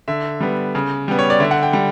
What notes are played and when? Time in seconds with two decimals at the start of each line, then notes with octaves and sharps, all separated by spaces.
0.08 D3 E5
0.41 G3 B3
0.75 C#3
1.08 G3 B3
1.19 C#5
1.30 D5
1.40 D3 E5
1.51 F#5
1.63 G5
1.73 G3